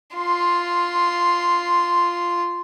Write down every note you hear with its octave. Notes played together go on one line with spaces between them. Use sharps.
F4 C6